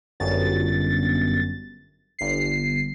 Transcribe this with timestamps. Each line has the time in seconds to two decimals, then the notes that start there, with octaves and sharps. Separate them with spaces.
0.20 G1 F#2 A6
2.19 G1 C7